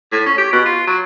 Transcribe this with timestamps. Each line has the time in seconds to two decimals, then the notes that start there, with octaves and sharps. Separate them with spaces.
0.12 A2
0.26 C#4
0.38 G4
0.53 B2
0.66 F4
0.87 F#3